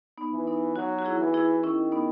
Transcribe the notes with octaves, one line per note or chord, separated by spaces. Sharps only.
B3 D#4
E3
B3 D#4
F#3 D#4 F#4
F#4
E4 G#4
E3
E4 G#4
D#3 C#4 E4
B3 D#4